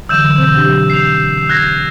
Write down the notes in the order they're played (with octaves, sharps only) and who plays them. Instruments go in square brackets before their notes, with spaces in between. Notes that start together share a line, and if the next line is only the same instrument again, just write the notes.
[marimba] D3 E3 F#3 [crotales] E6 G6 E7
[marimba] B2 C4 C5
F#3 D4 G4
[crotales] C7 F7
F#6 G#6 A#6